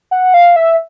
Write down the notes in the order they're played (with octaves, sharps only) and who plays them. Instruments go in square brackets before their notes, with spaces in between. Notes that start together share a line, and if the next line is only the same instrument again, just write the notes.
[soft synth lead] F#5
F5
E5